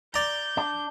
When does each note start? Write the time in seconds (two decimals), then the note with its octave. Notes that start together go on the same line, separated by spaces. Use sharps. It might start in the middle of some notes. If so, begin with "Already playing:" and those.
0.14 D5 A#5 G6
0.57 D4